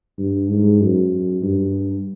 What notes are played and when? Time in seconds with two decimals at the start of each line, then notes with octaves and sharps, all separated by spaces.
0.18 G2
0.49 G#2
0.81 F#2
1.43 G2